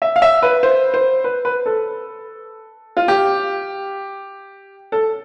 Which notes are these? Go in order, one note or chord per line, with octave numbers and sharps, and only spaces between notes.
E5
F5
E5
B4
C5
C5
B4
B4
A4
F4
G4
A4